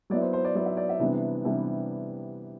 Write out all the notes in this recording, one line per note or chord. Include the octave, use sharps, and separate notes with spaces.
F#3 B3 E4 D5
C5
C5
D5
F#3 B3 E4 D5
E5
D5
E5
C3 E3 G3 B3 D4
C3 E3 G3 B3 D4